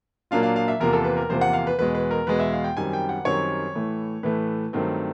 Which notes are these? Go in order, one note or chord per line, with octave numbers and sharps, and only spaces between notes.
A#2 F#3 A#3 D4 F4 F5
F5
F5
E5
E2 C3 F3 A#3 A#4
A4
B4
A#4
E2 C3 F3 A#3 C5
F#5
F5
B4
E2 B2 G#3 B4
B4
A#4
E2 B2 G#3 B4
E5
F5
G5
F#2 D#3 G3 C4 G#5
G5
F#5
F#2 D#3 G3 C4 C#5
A2 E3 A3
A2 E3 A3 B4
G2 D#3 F#3 A3 C4